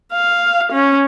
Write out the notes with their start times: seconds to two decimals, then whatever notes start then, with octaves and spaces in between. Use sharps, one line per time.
0.13 F5
0.73 C#4